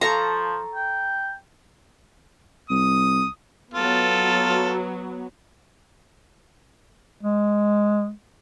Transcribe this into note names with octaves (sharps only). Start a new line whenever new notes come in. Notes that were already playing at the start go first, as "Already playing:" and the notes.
F3 A4 F5 A#5 C#6
G5
C2 D#6
F#3 B3 F4 A4
G#3